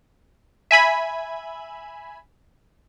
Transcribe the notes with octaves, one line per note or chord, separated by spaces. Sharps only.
E5 G#5 B5 G#6